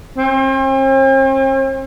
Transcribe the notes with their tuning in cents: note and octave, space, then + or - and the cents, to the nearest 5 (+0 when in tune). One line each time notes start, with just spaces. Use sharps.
C4 +45